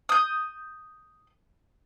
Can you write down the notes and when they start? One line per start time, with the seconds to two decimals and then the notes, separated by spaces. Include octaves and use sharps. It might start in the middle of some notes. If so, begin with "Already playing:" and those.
0.09 D#6 G6